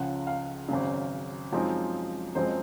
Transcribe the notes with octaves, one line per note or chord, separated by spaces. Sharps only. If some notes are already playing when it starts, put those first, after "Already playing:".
Already playing: C#2 C#3 F3 F#5
F5
G#1 F#2 C#3
F#2 F3 G#3 C4 D#4
F#1 F#2 F3 G#3 C4 C5